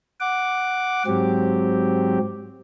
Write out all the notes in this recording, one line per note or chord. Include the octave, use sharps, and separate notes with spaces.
F#5 D6
G#2 F#3 C4 G4